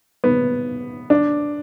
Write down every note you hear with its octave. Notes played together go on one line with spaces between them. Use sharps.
B3
D4